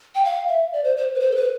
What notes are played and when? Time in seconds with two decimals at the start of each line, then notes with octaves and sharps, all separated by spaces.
0.15 G5
0.25 F5
0.48 E5
0.73 D5
0.84 C5
0.97 C5
1.15 B4
1.20 C5
1.31 A4
1.36 B4